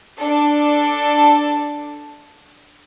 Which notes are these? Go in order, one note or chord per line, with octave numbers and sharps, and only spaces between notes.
D4 A4 D5 A5